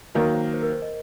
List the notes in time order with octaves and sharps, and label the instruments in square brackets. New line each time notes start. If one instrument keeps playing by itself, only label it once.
[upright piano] D#3 F#3 A#3 [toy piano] A#4
[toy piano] C5
C5
A#4
C5
D#5